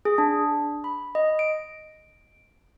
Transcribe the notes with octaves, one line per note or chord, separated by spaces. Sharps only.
G#4
D4
B5
D#5
D7